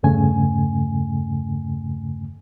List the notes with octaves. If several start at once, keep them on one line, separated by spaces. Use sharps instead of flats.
E2 G2 C#3 A3 G#5